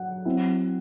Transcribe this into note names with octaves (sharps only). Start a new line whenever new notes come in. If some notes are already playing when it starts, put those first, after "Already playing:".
Already playing: F#3 F#5
F#3 C4 E4